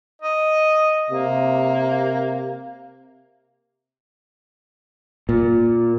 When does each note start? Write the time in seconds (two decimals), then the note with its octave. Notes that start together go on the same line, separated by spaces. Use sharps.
0.22 D#5
1.11 C3 A#3
5.29 A#2